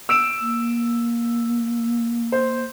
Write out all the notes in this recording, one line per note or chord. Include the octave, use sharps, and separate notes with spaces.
E6 D7 E7
A#3
C5